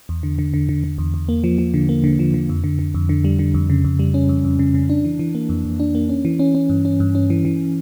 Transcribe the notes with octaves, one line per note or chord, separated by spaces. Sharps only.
E2
D3
D3
D3
D3
D3
E2
E2
A#3
F3
F3
D3
A#3
D3
F3
D3
F2
D3
D3
F2
D3
G3
D3
F2
C#3
F2
G3
C#4
F2
F2
C#3
C#3
D4
E3
E3
A#3
F2
F2
D4
A#3
C#4
E3
C#4
C#4
G2
C#4
G2
C#4
E3
E3